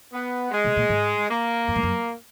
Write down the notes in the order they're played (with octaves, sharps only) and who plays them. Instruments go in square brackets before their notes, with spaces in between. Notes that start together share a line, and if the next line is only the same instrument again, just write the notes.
[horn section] B3
G#3
[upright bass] B2
A#2
G#2
[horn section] A#3
[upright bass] F#2
G#2
F#2